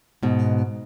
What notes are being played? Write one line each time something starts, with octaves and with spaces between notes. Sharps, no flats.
G#2 B2